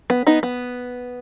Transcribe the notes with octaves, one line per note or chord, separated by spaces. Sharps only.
B3
B3 D#4
B3